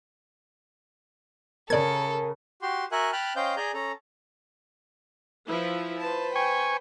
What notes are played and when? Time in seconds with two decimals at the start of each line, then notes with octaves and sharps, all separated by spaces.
1.70 C#3 A4 A#4 D5 G#6
2.62 F#4 G4 C6
2.92 F#4 A#4 E5 F#5 G#5 F#6
3.12 G5 A5 B5 F6 F#6
3.36 C#4 C5 D#5 F5 G5 G6
3.57 G#4 D5 G#5 A#5 G6
3.74 C#4 A4 A#5
5.48 F3 E4 B4
6.01 B4 C5 A5
6.36 G5 G#5 C#6